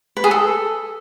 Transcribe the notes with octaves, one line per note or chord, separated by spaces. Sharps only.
B4
G#4
A4